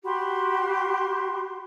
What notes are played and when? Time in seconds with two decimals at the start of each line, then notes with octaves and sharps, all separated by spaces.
0.04 F#4 G4 B5 C6